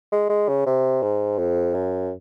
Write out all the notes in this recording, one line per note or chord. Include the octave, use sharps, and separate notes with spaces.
G#3
G#3
C#3
C3
G#2
F2
F#2